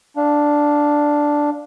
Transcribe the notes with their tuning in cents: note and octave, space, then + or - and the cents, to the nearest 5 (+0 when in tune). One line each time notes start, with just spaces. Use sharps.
D4 +0 F5 +0